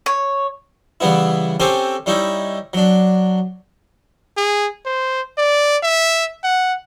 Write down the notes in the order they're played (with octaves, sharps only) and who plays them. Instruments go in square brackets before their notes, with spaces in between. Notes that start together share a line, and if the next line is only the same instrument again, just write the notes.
[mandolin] C#5
[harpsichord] C#3 E3 G3 B3 E4
C4 C#4 G4 A4 G#5
G3 C#4 D#4 E4
F#3 D4
[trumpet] G#4
C5
D5
E5
F#5